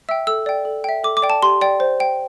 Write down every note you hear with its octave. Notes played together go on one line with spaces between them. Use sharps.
E5 G5 E6
A4 E6
D5 G5
A4
E5 G5
A4 D6
D6
D5 G5
A5
G4 C6
D5 G5
C5
G5